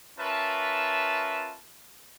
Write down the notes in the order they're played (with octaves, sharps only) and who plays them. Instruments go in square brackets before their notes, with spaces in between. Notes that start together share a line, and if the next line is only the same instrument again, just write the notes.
[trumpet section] C#4 F4 A#4 B4 E5 A5